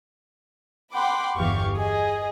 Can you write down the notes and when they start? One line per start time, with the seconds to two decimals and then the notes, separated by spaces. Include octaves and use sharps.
0.95 F#5 G5 B5 C6 D6
1.37 G1 E2 E3 G4 F5 C#6
1.76 G#4 D#5